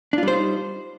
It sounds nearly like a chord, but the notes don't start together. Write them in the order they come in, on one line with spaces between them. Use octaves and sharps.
D4 F4 G3 C5 D#4